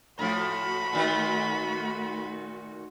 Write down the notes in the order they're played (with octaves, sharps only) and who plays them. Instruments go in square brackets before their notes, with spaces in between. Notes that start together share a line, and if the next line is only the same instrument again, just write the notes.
[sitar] A2 F3 [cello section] A3 F#4 [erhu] B5
[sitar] A#2 D#3 B4